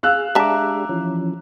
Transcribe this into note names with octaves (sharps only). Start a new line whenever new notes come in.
G#4 F5 E6 F#6
G#3 D4 G4 E5 A5 A#5 D6
E3 F3 C#4